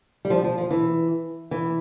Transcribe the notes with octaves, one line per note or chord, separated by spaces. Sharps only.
G3
F3
F3
F3
E3
E3